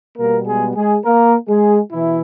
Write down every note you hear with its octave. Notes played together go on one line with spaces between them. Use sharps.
B2 G3 A#3 B3 A#4
G#3 G#4
G#3 G#4
A#3 A#4
G#3 G#4
B2 E3 E4